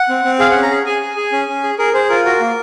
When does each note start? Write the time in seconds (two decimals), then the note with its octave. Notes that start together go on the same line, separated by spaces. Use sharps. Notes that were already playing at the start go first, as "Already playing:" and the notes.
Already playing: F#5
0.09 C4
0.24 C4
0.39 G#4 F5
0.51 C#4 F#5
0.63 A#5
0.71 G#4
0.86 G#4 G#5
1.02 G#4
1.17 G#4
1.32 C#4
1.48 C#4
1.63 G#4
1.79 G#4 A#4
1.94 G#4 C5
2.09 F4 A#4
2.25 F#4 A#4
2.40 A#3